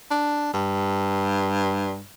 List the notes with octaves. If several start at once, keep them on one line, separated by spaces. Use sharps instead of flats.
D4
G2